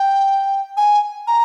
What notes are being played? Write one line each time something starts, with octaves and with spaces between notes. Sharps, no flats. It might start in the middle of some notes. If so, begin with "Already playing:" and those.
Already playing: G5
G#5
A#5